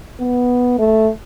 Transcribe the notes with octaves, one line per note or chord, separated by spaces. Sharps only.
B3
A3